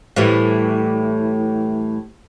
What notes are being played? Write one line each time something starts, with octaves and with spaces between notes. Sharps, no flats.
A2 E3 G3